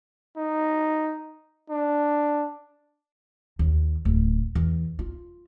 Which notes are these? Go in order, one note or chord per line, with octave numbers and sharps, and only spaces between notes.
D#4
D4
D#2
D1
E2
F4